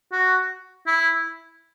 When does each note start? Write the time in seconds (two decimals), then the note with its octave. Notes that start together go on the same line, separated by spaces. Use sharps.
0.12 F#4
0.87 E4